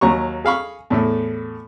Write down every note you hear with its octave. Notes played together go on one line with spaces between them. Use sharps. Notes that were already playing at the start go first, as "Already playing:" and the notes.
D#2 F#3 A#5 C#6
G#4 F5 B5 C#6
E2 A2 A3